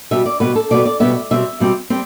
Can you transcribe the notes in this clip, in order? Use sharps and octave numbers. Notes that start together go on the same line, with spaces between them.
B2 G3 B3 E5
D5
B2 G3 B3 B4
A4
B2 G3 B3 D5
D5
B2 G3 B3 E5
B2 G3 C4 E5
B2 G3 C4
G3 C4